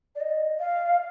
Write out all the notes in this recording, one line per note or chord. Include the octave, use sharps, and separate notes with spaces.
D5
D#5
F5